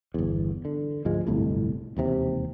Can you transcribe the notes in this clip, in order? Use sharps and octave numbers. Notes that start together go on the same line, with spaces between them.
G1 E2
D3
D2 G#2 F3 G#3
D1 G1 C2 A2
E1 D#2 C3